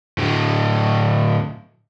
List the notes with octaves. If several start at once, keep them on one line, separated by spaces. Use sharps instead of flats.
A2 D3